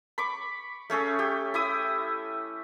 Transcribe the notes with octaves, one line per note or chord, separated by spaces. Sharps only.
B5 C#6 D6
A3 C#4 G#4 A4
G4
E4 E5 D#6